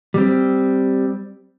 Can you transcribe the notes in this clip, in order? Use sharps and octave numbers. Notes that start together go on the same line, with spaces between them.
G3 C4